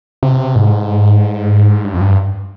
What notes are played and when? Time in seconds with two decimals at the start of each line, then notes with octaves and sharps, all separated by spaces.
0.23 C3
0.56 G#2
1.84 G2
1.94 F2
2.01 G2